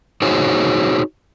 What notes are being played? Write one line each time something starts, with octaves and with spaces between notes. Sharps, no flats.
D#4 F#4 G#4 C5 C#5